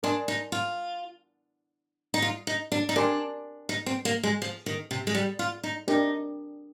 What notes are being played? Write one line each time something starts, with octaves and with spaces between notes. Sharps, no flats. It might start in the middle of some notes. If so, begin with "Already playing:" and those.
D4 A#4 D#5 G#5 C6
D#4
F4
D#4
F4
D#4
D4
D#4
D4 G4 A#4 D5 G#5 C6
D#4
C4
A#3
G#3
F3
D#3
C3
G#3
G3
F4
D#4
D4 D#4 G4 A#4 D5